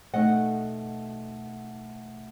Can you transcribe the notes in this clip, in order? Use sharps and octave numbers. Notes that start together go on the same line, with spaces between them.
B2 A3 D#4 D#5 F#5